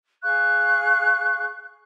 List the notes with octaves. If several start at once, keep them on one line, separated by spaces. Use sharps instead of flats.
G#4 F5 C#6 F#6